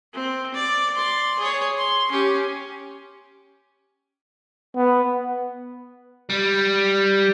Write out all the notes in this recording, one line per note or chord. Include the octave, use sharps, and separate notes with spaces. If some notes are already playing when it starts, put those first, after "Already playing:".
C4
D5
D5 C6
G#4 C#5
C6
C#4 G4
B3
G3